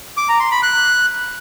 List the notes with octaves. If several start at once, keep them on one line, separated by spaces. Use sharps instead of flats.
D6
A#5
C6
B5
F#6